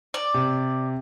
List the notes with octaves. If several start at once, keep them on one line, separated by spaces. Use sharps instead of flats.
D5
C3